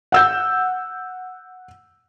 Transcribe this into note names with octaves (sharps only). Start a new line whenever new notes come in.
F#5 E6 G6